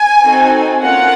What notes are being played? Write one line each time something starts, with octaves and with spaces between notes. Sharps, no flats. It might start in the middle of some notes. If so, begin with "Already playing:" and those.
Already playing: G#5
C4 D#4 F#4 A4
A#3 C#4 F4 F#5